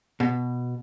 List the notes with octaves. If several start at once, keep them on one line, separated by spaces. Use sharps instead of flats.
B2